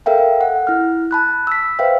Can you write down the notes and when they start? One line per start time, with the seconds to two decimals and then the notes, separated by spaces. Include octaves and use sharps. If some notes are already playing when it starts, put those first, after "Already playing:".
0.06 A4 A#4 E5 F5 G5
0.41 F#5
0.67 E4 F6
1.11 A5 B5 F#6
1.47 E6 B6
1.79 B4 C5 E5 F5 G5